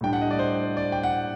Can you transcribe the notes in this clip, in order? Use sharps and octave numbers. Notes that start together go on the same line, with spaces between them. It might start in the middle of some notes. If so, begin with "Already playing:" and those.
A2 G3 D4 G5
F#5
D#5
D5
C5
D5
G5
F#5